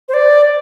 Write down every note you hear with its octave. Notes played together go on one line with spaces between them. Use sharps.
C5
D5